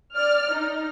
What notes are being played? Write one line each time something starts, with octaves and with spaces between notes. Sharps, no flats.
D5 F6
D#4